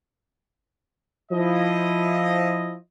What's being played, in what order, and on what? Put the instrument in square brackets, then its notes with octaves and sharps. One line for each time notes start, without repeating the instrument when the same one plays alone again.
[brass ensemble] F3 E4 D#5